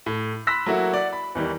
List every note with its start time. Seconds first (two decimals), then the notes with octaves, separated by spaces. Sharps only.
0.06 A2
0.47 B5 C6 E6 F#6 A#6 B6
0.66 F#3 A3 A#3 E4 F#4
0.94 D5 F#5
1.13 B5
1.35 E2 D#3 E3 G3